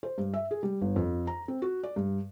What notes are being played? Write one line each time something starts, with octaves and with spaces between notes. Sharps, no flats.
C5
G2
E5
G#4
G3
G1
F2
A#5
C4
F#4
D5
G2